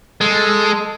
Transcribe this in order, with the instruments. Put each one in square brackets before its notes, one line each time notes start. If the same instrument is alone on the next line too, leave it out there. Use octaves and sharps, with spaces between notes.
[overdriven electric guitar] G#3 [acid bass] A4